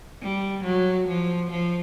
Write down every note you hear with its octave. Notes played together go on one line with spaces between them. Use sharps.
G3
F#3
F3
F3